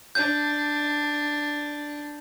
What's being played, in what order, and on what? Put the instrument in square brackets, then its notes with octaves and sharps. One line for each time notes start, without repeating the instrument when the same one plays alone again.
[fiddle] D4 [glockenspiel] G6